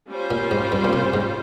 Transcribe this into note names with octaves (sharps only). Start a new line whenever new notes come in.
G3 C#4 F4 C5
A#2
G#2
G2
A#2
C3
G#2